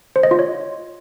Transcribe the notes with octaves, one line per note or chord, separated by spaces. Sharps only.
C5
D#5
F4
C#5